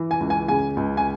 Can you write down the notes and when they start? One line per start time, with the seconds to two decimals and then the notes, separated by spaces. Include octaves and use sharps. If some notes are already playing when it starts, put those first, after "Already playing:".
Already playing: E3
0.11 G#5
0.20 C#2
0.30 G#5
0.48 C#3 G#5
0.77 C#2
0.97 G#5